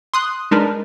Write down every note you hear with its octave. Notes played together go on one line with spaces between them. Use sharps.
C6 D#6 F#6
G#3 D4 D#4 A#4 B4